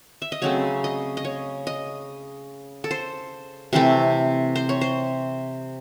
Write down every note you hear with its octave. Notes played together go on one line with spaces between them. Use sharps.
E5
D#5
C#3 F#3 A3 C4 C#5
D#5
D#5
C#5
D#5
A4
C5
C3 E3 A3 C4
C5
C#5
C5